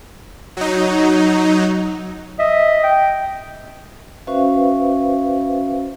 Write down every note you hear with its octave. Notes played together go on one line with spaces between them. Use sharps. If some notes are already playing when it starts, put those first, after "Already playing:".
F#3 D#4
D#5 E5
G5
C#4 F#4 B4 C5 E5 F5